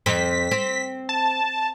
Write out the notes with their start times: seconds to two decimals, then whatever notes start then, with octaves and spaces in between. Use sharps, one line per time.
0.06 F2 C4 B6
0.51 C4
1.09 A5